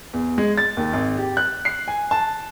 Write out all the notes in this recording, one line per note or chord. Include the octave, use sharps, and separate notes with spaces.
E2
G#3
A6
D#2
G#1
G4
F#6
C7
G#5
A5